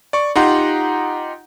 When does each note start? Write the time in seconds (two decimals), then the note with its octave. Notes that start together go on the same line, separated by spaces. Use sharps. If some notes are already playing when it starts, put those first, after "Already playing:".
0.13 D5 C#6
0.36 D#4 F4 G4 F#5 A#5 C6